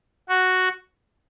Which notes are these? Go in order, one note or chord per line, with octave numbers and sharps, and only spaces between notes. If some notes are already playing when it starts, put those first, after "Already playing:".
F#4